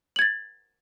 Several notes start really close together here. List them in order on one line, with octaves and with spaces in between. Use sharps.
F#7 G#6 A6